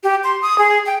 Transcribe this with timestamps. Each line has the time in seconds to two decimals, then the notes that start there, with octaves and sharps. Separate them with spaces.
0.03 G4
0.24 C6
0.42 D#6
0.58 G#4
0.86 G5